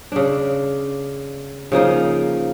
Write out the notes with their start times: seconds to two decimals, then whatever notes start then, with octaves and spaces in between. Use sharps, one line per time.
0.12 C#3 D4
1.72 C#3 F3 A#3 D#4